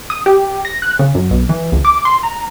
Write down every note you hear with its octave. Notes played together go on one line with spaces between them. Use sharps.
D#6
G4
A#6
F#6
C#3
F#2
B1
E3
C#2
D6
C6
A#5